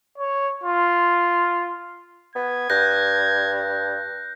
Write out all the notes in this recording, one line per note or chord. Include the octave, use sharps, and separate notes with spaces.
C#5
F4
B3 G#6
G2 F#6 G6 A#6